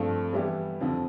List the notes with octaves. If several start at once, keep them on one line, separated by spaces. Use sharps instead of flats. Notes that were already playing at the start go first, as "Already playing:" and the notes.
Already playing: G2 F3 A3 C4
E3 G3 B3 E4 G4
F2 D3 F3 C4